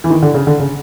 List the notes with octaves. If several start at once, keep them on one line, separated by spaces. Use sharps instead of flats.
E3
D#3
D3
C#3
D3
C#3